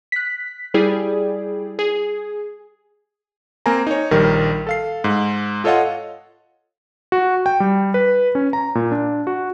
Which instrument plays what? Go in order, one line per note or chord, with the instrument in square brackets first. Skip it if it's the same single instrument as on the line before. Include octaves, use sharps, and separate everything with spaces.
[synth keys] F#6 B6
G3 E4 G4 G#4 D5
G#4
[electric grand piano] A#3 C4 A#4 G#5 A#5
D#4 C#5
A#1 D#3 G3 A#4
A4 F5 C7
G#2
F4 A4 C#5 D#5 F5 F#5
F#4
G5
G3
B4
C#4
A#5
A#2
D4
F#4